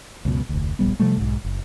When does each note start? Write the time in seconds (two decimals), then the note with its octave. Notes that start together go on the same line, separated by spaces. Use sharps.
0.25 C#2 F#2 B2
0.49 F1 D2
0.79 D1 A#1 G3 B3
1.00 C3 F3 G3 A3
1.18 B1 G#2
1.44 F#1